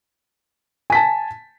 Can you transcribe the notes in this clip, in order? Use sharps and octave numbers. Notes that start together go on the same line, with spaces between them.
G#5 A5 B6